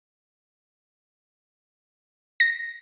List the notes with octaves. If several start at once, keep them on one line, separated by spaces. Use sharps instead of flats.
A#6